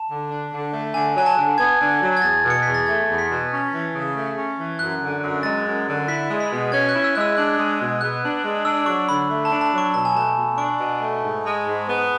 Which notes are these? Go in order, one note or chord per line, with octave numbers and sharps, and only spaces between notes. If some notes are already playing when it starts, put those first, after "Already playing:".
Already playing: A5
D3
D4
D3
A3
D3 G#5
F#3 G#5
A5
D3
B3 G#6
D3
F#3
G#6
E2 A6
B2
C#7
E2 B6
A6
A3 G#6
E2
B6
B2
C#4
E3
C#3
A3
C#4
E3
F#2 F#6
D3
F#2
G#3 A6
F#2
D3
E4 B6
G#3
B6
B2
C#4 G#6
F#6
E4
E6
G#3 F#6
E6
D4 F#6
G#3
B2
B3 F#6
D4
G#3
D4 E6
F#3 C#6
D3 B5
A3
A5
D4
A5
F#3
C#6
B2 A5
G#5
A3 A5
B2
D4 C#6
B2
A3
G#2
G#3
G#2
B3